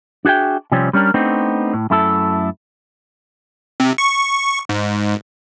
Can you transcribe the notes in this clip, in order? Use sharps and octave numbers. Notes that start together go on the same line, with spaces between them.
D4 F#4 G#4 E5 G5
C3 F3 G3 C4 C#4
G3 C#4 D4 G4 A#4
A3 B3 C4 D4 D#4
A2
F#2 A3 E4 G#4 A4
C3
C#6
G#2